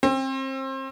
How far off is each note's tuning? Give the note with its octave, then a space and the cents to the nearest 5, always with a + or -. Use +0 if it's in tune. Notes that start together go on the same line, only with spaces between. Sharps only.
C4 +30